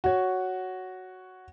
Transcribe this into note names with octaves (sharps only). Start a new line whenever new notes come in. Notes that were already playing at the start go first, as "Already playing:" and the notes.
F#4 C#5